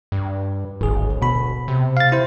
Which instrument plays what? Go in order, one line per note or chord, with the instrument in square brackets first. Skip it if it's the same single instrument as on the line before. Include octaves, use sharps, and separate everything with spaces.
[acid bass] G2
[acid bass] D1 [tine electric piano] G#1 G#4
[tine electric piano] B2 B5
[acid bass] C3
[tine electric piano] F5 A6
E4 C5